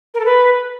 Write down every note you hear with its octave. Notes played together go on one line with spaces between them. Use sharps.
A#4
A4
B4